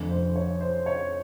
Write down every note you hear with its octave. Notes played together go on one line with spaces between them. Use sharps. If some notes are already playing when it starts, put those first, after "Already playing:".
Already playing: F1 F2 D3
C5
C#5
C5
C#5